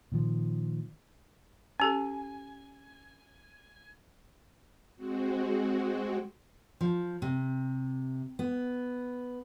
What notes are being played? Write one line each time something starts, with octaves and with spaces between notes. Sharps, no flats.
A#2 D#3 F3
C#4 G4 A4 G#5
G#3 C4 F#4
F3
C3
B3